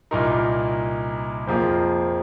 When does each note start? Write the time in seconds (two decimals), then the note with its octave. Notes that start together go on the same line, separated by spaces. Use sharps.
0.11 C2 A#2 A#3 D#4 A#4
1.47 F2 F3 A#3 G#4 F5